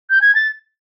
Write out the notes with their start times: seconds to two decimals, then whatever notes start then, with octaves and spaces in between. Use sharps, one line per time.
0.10 G6
0.21 G#6
0.35 A6